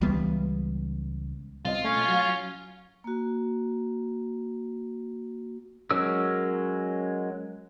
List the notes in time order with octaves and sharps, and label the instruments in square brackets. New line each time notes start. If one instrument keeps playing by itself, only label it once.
[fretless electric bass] C#2 E3 G3 B3
[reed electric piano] C2 C4 D#5 [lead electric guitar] F4
[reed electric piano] B2 A3 [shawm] C#4
[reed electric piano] F#3
[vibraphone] A#3 F#4
[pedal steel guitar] F#3 G#3 C#4 A#4 E6